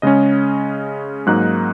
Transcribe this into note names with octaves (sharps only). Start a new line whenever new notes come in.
C#3 G#3 C#4 D#5
G#2 F#3 A#3 D#4 F#6